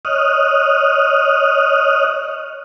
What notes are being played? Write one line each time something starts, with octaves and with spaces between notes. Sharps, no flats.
C#5 D#5 D#6 F6 F#6